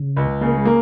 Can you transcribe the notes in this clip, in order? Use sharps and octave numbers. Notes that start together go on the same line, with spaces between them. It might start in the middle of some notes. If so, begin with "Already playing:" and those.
Already playing: C#3
C#2
C#3 A#3
G#3
A#3